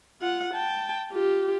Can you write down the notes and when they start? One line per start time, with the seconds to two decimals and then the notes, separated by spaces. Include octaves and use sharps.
0.21 F4 F#5
0.53 G5 A5
1.11 F4 G4